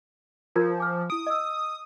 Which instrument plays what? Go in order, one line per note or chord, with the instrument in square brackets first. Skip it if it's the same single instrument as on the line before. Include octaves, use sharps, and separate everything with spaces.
[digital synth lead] F3 [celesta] F4 A#4 G#6
[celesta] G#5 D6 F6
[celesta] E4 D7 [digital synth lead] D#6
[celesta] D#5 E6